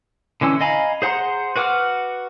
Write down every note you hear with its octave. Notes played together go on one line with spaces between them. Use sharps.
D3 E3 C#4 E6
D#5 F5 G#5 A#5 B5
G#4 C5 F#5 A#5 C6
F#4 B4 F#5 D6 F6